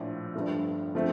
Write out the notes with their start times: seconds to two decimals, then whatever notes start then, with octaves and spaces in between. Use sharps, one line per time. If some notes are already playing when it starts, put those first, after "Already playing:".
Already playing: A#1 A2 F3
0.34 G1 G2 F3 A3
0.95 D3 F3 A3 C4